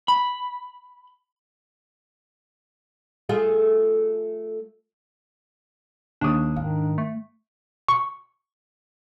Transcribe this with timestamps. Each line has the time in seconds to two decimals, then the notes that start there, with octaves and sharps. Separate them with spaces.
0.08 B5
3.29 A3 F4 G#4
6.21 D#2 D4 C#6 D#6
6.56 G#2 D#3 F5
6.98 A3
7.89 C#6